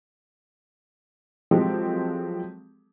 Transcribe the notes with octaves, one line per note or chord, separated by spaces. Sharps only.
F3 F#3 G#3 C4 G4 A4